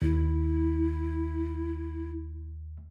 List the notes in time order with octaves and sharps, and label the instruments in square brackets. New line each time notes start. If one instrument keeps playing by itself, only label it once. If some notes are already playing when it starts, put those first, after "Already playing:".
[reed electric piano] D#2 [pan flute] E4